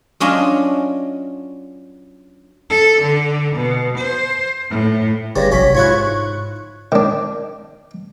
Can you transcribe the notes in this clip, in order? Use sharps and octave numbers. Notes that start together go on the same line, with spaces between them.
F#3 C#4 D4 F4 D#5 F5
A4
D3
B2
C5
A2
G1 G2 C#3 G3 A#6
A#1 C3 F#3 C#4 B6
G#2 E4 F4 C#5 C#6 F#6
D#3 D4